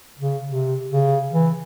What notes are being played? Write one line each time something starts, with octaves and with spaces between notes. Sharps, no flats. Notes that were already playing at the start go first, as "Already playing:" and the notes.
C#3
C3
C#3
E3